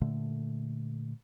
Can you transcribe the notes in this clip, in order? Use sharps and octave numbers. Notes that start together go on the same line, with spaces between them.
A#2 D3 A3